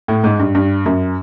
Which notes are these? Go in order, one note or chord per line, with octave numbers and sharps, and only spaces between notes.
A2
G#2
G2
G2
F#2